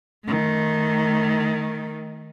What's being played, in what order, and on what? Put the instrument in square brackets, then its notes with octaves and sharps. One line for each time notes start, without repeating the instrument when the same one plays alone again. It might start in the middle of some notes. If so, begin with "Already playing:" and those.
[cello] D#3 A3